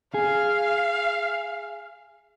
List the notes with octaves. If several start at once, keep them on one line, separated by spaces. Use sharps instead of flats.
G#4 F5